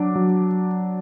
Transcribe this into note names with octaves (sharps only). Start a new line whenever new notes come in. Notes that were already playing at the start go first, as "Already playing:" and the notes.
Already playing: F#3 D4 D6
F#3